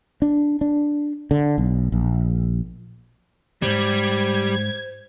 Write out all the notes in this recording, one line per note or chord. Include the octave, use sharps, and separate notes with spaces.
D4
D4
D3
B1
A#1
E2 G#2 G3 C5 G#6